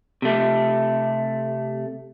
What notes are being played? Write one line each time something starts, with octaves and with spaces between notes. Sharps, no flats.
C3 A3